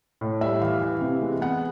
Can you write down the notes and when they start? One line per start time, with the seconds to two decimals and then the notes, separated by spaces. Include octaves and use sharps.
0.21 A2
0.41 G3 E5
0.61 E3 F5
0.81 E3
1.01 C3
1.22 G#3
1.41 B3 F#5